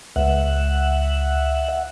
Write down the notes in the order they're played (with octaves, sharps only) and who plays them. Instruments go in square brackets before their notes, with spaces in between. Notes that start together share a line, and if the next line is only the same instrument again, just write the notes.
[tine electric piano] C#2 [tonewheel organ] E5 F#5